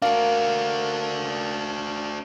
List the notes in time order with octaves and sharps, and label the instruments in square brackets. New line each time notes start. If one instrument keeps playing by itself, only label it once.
[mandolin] A#3 A#4 [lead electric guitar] D4 F#4 [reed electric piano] F5